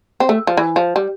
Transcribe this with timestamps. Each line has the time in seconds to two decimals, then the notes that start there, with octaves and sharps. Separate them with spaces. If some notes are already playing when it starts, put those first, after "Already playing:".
0.20 C4
0.29 A3
0.47 F3
0.57 E3
0.76 F3
0.96 G3